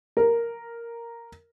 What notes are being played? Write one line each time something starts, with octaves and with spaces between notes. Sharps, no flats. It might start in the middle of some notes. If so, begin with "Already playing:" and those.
A#4